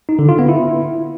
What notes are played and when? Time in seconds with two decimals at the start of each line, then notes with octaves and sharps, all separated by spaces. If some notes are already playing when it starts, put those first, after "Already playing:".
0.09 D#4
0.19 D3
0.29 F4
0.39 B3
0.49 E4